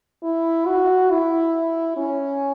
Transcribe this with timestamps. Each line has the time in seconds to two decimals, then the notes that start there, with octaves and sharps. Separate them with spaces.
0.23 E4
0.66 F#4
1.10 E4
1.97 C#4